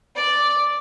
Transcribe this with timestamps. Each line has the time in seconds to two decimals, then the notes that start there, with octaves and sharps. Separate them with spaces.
0.16 D5